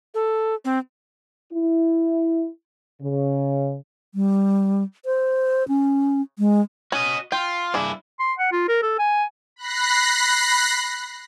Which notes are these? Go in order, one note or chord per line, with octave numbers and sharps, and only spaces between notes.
A4
C4
E4
C#3
G3
C5
C#4
G#3
C#4 F#4 D#5
F4 G5
G2 D4 E4 G#4
C6
F#5
F4
A#4
A4
G#5
B5 F#6 A#6 C7